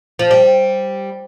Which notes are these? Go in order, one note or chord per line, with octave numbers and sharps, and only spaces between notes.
F3
G3